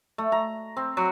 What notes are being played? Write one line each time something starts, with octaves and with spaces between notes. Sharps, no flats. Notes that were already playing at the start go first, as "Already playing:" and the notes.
A3
A#5
C4
F#3